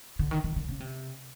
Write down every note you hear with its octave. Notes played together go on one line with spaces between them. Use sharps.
D3
D#3
D#3
D3
C#3
C3